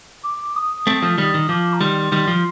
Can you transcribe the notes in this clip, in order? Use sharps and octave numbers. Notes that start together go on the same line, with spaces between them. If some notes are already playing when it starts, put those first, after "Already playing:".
D6
D#6
A3 C4
F3 A3
D#3 G3
D#3
F3 D6
A#5
D#3 G3 C6
D#3 G3
F3